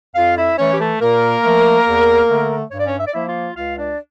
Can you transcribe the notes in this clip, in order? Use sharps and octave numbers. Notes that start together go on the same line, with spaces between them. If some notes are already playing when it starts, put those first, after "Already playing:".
F2 F4 F5
E4 E5
E3 A3 C#4 C#5
G4
A3 A4
A#2 A#3 A#4
F3 A3
E2
D3 A3
G2 C#5
D5
C#4 C#5
E5
D5
F3 A#3 E4 E5
F4 F5
C#2 F4 F5
D4 D5